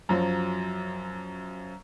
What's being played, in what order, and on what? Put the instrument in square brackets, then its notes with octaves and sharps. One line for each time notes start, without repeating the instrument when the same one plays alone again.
[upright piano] F#2 F3 F#3